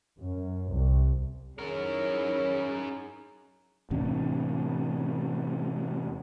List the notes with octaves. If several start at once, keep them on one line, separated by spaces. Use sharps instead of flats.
F#2
C2
D#3 F#3 C#4 D#4 E4 G#4 A#4 C#5
E2 A2 C3 D4